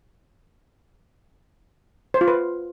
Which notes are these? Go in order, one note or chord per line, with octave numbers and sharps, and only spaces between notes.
C5
F4
B4